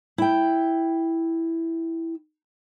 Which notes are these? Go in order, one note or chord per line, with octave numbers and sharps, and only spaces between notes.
E4 G5